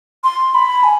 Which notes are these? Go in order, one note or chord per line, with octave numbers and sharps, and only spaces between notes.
C6
B5
G#5